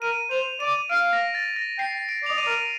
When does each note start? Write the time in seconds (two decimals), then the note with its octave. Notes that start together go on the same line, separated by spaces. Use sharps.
0.02 A#4 D#7
0.30 C5 F7
0.60 D5 D#7
0.90 F5 D7
1.13 A#6
1.34 A6
1.56 A#6
1.78 G5 C7
2.09 D7
2.23 D5
2.26 D#5 F7
2.37 D5 D#7
2.46 A#4